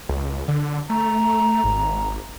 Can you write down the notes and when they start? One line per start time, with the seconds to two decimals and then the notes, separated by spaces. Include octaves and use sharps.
0.09 C#2
0.48 D3
0.90 A3 A#5
1.64 G#1